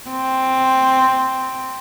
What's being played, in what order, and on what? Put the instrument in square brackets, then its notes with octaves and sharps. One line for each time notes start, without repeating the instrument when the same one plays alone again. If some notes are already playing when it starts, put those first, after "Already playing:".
[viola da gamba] C4